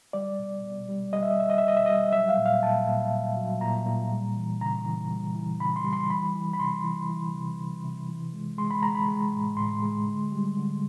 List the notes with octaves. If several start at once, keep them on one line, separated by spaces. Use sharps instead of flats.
G3 D5
B2
B2
G3
G3 D#5
E5
D#5
G3 E5
D#5
E5
B2 D#5
E5
G3 D#5
F#3 E5
F5
A#2
F5
A#2 A5
A#2
A#2
F#3
A#2 A#5
A#2
G3
E3
C#3 A#5
E3
G3
E3
C#3 B5
C6
G3
C6
E3 B5
E3
B5
C3 C6
E3
E3
C3
C3
C3
E3
G#3
G#3 C6
B5
G#3 A#5
B5
G#3
A2
A2 C6
G#3
D3
G3
D3